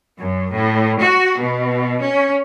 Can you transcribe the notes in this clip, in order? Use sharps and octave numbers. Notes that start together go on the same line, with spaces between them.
F#2
A2
F#4
B2
C#4